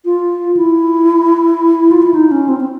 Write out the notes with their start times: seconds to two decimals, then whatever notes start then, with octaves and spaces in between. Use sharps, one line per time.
0.05 F4
0.57 E4
1.92 F4
2.02 E4
2.14 D#4
2.31 C#4
2.48 C4
2.60 C4